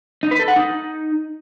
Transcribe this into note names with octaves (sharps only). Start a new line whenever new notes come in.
D#4
B4
A4
F#5
D#4